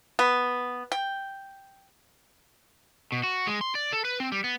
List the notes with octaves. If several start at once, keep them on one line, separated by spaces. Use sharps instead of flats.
B3
G5
B2
F#4
G#3
C6
D5
A4
B4
C4
G3
B3